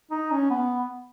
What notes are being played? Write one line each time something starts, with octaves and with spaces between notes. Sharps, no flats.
D#4
C#4
B3